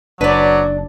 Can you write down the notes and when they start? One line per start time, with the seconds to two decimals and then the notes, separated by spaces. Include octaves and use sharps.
0.21 F#1 F#3 D4 B4 D5